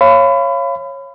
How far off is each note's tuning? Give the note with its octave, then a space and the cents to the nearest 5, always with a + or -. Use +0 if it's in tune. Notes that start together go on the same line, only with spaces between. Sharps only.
C#5 -15 F5 -25 B5 +30